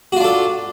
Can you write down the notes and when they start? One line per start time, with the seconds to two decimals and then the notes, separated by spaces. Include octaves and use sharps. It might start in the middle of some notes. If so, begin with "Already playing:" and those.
0.12 F#4
0.16 F4
0.20 D4
0.24 A4